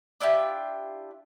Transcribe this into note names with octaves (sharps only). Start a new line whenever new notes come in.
D4 E4 F4 G4